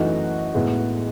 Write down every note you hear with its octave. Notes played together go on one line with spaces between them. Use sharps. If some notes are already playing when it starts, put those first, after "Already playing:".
Already playing: F#2 E3 A3 D#4 F#4
A2 G#3 B3